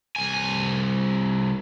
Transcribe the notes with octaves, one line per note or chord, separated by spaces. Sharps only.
C2 G#5